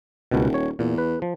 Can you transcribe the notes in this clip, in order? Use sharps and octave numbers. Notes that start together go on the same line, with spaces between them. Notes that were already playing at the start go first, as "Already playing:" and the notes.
D#1 C#2 B2
C#5
E2 A#2
B4
F3